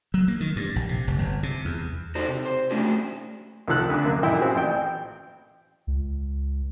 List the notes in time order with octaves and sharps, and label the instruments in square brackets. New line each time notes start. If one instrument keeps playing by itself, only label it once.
[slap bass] F#3
A#3
D#3
G2
A#1
C3
F1
G1
C3
E2
[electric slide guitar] D#4 F#4 A4 C5 D5
C3
C5
A3 C#4 D4 E4 F#4 G#4
[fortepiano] C2 D#3 F3 A4 F#6
D2 D4
F#2 A#3
G#1 F#2 A#2 E4 G5
C4 F4 F#4 G#4
A1 G5
[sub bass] C#2